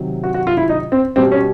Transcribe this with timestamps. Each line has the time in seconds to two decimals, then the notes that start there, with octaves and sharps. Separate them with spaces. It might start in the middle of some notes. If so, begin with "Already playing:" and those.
Already playing: C3 D#3 F#3
0.24 F#4
0.34 F#4
0.47 F4
0.57 E4
0.69 D#4
0.92 C4
1.16 B2 G3 C4
1.32 C#4